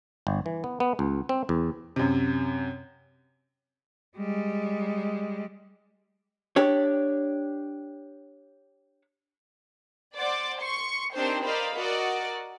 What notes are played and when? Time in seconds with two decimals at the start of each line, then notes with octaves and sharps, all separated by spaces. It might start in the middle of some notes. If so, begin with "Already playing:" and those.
0.27 G1
0.46 E3
0.64 B3
0.80 B3
0.99 C#2
1.29 C4
1.49 E2
1.96 F#2 C3
4.18 G3 G#3
6.56 D4 G4 C#5
10.16 C5 D5 F#5 D6
10.59 C6 C#6 C#7
11.14 C4 D4 D#4 G4 A#4 C5
11.44 A#4 C5 D5 D#5 F5 B5
11.75 F#4 A#4 D5 D#5